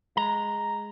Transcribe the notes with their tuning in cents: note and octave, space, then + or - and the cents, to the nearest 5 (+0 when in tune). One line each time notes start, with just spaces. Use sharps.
G#3 +0 A#5 +0